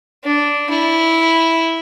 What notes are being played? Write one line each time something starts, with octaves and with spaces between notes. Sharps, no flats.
D4
E4